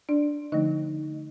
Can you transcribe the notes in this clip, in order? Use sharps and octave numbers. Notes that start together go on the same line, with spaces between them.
D4 D5
D3 F3 A3 D#4 D#5